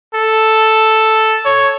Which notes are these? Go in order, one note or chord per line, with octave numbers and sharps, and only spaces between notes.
A4
C#5